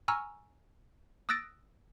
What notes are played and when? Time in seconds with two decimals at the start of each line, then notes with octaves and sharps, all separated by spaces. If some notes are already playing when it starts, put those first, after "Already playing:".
0.08 G#5 A#5 C#6 E6 F6
1.29 D#6 E6 F#6 A6 A#6 D7